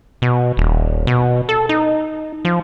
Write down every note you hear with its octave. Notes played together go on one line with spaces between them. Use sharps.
B2
D#1
B2
A4
D#4
F3